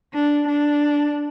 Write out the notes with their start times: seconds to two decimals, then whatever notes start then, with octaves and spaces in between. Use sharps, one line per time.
0.14 D4
0.48 D4